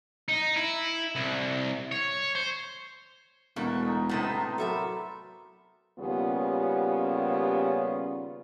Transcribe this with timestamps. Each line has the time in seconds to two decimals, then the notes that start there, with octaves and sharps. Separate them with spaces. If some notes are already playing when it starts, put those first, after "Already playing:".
0.28 D#4
0.56 E4
1.15 C2
1.92 C#5
2.35 C5
3.56 E1 B2 A3 A#4 F#5 C#6
3.86 D#4
4.09 A2 C3 F#3 B3 C4 D#4 A5
4.58 F#3 A4 A#4 D5 E5 B5 C6
5.99 D#2 C#3 G3 B3 C#4 F4